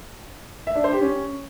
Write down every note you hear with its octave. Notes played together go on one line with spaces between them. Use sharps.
E5
D4
C5
G4
C#4